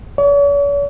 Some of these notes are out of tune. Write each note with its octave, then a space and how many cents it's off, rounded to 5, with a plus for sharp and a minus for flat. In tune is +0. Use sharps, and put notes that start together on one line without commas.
C#5 +45